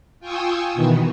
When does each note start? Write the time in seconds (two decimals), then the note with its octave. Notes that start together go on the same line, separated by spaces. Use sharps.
0.20 F4 G5 G#5 C#6 D#6 E6
0.74 B2 D#3 E3